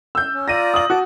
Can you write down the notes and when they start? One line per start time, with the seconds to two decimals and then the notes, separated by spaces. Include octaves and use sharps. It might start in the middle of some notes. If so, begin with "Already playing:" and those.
0.15 E6 G6
0.34 C#4
0.48 F4 D5 A#5 A#6 D#7
0.74 D#6 F#7
0.90 F#4 A5 D6